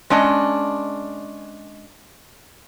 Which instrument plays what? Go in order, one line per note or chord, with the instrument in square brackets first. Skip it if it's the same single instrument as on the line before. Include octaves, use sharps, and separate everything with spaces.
[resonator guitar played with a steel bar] G#3 C#4 D4 D#5